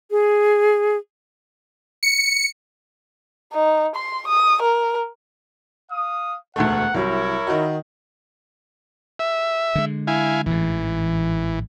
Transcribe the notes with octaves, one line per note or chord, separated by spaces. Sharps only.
G#4
C#7
D#4
C6
D#6
A#4
F5 D#6
E1 D2 A3 F#5
C2 F#3 E4 A#4 C#5
D#3 D#4 F#4
E5
D3 G#3
E4 F5 G#5
A1 G#2 E3